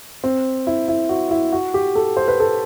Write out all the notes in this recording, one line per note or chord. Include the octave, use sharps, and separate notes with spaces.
C4
E4
E4
F#4
E4
F#4
G4
A4
C5
B4
A4